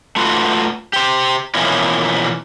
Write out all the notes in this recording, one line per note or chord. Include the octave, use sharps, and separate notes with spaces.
A3 F4 F#4 B4
G4 C5
B2 E3 F3 A#3 C#4 E4